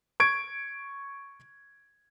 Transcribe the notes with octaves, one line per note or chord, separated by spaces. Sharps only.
C#6 G#6 D7